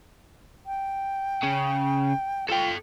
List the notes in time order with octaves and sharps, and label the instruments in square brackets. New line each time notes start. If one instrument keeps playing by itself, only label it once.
[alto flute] G5
[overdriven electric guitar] C#3
[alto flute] F4 [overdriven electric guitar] A4 G5